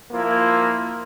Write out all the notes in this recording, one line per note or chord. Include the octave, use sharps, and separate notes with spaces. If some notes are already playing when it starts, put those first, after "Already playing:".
F3 A#3 E4 F4